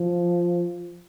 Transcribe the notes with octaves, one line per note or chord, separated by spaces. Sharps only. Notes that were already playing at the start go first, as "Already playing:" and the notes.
Already playing: F3